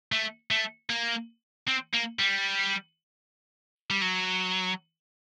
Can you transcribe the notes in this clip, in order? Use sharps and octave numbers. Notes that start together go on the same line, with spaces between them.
A3
A3
A#3
C4
A#3
G3
G3
F#3